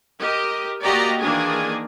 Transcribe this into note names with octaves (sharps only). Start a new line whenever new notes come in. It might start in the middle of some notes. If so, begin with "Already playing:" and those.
G4 A#4 D#5
A#3 F#4 G4 D5 D#5 A#5
D#3 E3 A#3 D4 G#4